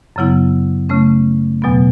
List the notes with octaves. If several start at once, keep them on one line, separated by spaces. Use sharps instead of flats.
F#2 C#3 F#3 B3 E4
C#3 A3 C#4
E2 B2 F#3 B3